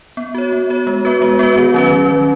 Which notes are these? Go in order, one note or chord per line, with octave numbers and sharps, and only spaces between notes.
B3
F#4 C#5
B3
F#4 C#5
G#3
B3 F#4 B4
G#3
B3 F#4 B4
D#3
F#3 C#4 B4
D#3
F#3 C#4 B4